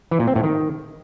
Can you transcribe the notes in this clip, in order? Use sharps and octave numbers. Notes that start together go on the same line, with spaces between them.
E3
A#2
C4
A2
D#3